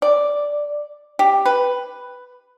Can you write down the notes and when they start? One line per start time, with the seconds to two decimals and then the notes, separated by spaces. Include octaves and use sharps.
0.02 D5
1.19 G4
1.46 B4